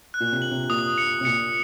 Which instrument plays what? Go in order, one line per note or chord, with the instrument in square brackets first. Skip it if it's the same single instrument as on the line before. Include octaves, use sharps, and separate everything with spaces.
[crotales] F#6
[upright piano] A#2
C3
[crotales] F#7
[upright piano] C3
[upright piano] A#2 [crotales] D#6
[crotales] C#7
[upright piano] C3
[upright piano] A#2 [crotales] C#7